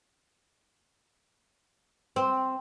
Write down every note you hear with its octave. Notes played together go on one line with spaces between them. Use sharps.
C4